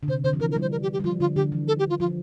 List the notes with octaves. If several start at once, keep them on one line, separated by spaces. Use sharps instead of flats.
D3
C3 C5
D3 C5
F3
E3 A#4
A#4
G3
C5
A#4
G4
G4
G3
F3 F4
D3 F4
D3 G4
E3
A4
G4
F4
F3 F4